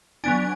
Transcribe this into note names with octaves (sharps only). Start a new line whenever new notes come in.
F#3 B3 D4 G#5